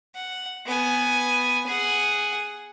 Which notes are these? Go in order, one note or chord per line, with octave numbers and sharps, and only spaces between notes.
F#5
B3 G#5
G#4 F#5